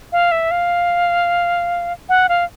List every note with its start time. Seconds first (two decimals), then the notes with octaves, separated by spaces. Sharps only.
0.12 F5
0.32 E5
0.51 F5
2.09 F#5
2.29 F5